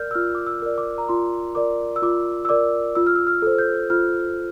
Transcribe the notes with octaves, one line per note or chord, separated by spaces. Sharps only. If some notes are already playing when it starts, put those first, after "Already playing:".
Already playing: A#4 D5 F6 G6
E6
F4 F6
D6
E6
A#4 D5
D6
A#5
F4 C6
A#4 D5 D6
E6
F4 D6
E6
A#4 D5 D6
F4 E6
F6
E6
F6
A4 C5
G6
F4 F6